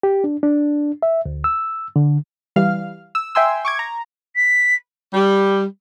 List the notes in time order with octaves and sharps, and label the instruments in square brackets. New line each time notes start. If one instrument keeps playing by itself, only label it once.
[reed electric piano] G4
D4
D4
E5
D2
E6
D3
[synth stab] E3 G3 F5 F6
E6
E5 G5 G#5 C6 E6
C#6 D6 G#6
A#5
[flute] B6
[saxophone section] G3